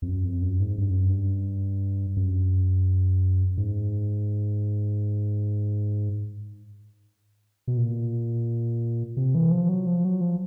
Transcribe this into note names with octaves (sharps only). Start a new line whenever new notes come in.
F2
F#2
F2
F#2
G#2
G2
F#2
G2
F#2
G#2
B2
A#2
C3
E3
F3
F#3
F3
F#3
F3